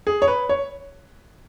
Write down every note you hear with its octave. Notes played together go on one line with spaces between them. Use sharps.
G#4
C#5
B4
C#5